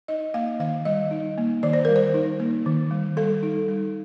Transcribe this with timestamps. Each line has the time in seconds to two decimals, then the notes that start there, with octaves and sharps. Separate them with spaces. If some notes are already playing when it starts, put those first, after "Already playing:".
0.08 D#4 D#5
0.34 A#3 F5
0.60 D#3 F5
0.85 G3 D#5
1.11 D#4
1.38 A#3
1.63 D#3 D5
1.73 C5
1.85 G3 A#4
1.96 C5
2.14 D#4
2.40 A#3
2.66 D#3
2.91 G3
3.17 G3 A4
3.43 D#4
3.68 G3